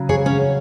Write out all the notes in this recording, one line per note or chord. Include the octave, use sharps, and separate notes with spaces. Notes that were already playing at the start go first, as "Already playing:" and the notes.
Already playing: C#3 F#3
G#4 C#5
C#4